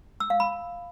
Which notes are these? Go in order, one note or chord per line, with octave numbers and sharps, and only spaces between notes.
E6
F5
B5